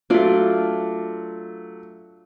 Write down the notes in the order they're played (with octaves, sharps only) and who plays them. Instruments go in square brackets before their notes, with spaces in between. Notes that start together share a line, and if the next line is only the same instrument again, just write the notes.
[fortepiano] F#3 A3 [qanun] D4 F4 D5